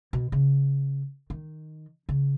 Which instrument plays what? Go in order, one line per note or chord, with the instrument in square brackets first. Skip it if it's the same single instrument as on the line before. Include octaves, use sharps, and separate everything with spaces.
[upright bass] B2
C#3
D#3
C#3